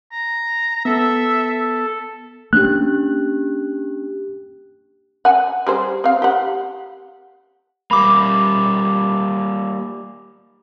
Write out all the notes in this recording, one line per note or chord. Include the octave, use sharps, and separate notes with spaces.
A#5
B3 A4 E5
A#3 B3 C#4 D4 G4 F#6
F#5 G#5
G3 G#4 C5
C4 F5
G4 F#5
G3 A#3 B5 D6